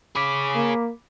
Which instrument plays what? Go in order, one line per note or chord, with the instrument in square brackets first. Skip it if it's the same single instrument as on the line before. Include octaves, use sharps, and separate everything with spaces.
[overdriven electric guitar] G#4 C#5 [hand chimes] B5 D6 B6
[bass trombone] A#3